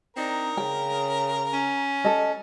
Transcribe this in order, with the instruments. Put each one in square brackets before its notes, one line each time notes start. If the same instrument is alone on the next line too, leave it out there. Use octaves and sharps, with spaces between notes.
[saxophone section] C4 D4 D#4 [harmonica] A#4
[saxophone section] C#3 [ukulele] G5
[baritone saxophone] C#4
[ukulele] A4 D#5